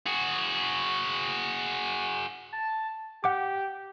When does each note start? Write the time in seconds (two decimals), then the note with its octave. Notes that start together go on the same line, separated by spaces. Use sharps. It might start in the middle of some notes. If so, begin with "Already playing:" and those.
0.06 F#4 G#4
2.53 A5
3.24 G4 F#5 D6